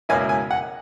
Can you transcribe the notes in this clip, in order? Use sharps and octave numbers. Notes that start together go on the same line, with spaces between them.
C#2 B2 A#3 C#4 E4 G#5
G#5
F#5